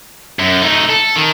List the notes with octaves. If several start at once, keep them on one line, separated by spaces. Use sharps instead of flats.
F#2
A3 D#4
A4
D#3